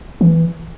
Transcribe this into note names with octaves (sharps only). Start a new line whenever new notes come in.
E3